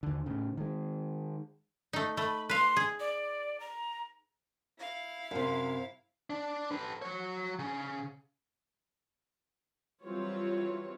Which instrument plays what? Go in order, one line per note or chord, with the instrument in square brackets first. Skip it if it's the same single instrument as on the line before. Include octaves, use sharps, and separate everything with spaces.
[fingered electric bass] D#2 D3
A2 C#3
D#3 G#3
[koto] A3 D#4
[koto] A3 [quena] B5
[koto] B4 F5 [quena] C6
[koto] G#4
[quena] D5
A#5
[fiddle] E4 F5
[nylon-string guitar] F#2 C3
[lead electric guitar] D4
A4 B4
F#3 C#5
C#3
[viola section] E3 F#3 G3 C4 F4 C#5